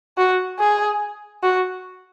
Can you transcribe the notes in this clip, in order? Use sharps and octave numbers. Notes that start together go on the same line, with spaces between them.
F#4
G#4
F#4